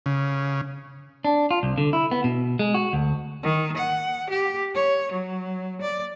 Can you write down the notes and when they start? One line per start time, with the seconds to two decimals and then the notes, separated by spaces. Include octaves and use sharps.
0.06 C#3
1.25 D4
1.51 F4
1.63 C2
1.78 D3
1.93 E4
2.11 B3
2.24 B2
2.59 G#3
2.74 F#4
2.93 D2
3.43 D#3
3.77 F#5
4.29 G4
4.75 C#5
5.11 F#3
5.81 D5